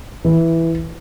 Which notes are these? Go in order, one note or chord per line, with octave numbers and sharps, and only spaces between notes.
E3